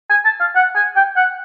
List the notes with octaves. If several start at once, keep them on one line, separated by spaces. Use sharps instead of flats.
G#5
A5
F5
F#5
G#5
G5
F#5